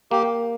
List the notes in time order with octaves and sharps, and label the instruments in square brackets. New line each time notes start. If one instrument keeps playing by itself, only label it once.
[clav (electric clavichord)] A#3 [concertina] G4